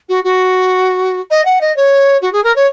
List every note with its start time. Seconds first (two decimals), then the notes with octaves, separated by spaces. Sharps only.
0.08 F#4
0.24 F#4
1.30 D#5
1.45 F#5
1.61 D#5
1.76 C#5
2.21 F#4
2.32 G#4
2.44 A#4
2.55 C#5